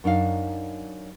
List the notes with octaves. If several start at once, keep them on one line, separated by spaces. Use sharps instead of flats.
F#2 D4 D#4 F5